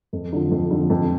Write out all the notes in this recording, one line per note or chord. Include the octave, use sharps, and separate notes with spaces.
F2
D3 F3
F2
D3 F3
F2